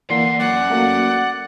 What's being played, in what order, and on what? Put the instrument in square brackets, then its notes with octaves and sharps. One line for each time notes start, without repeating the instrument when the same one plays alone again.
[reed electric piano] E3 A#3 [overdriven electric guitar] D5 F#5 [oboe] C6
[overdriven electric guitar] F#3 C#4 [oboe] D5 [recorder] F#5
[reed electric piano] A3 A#3 F#4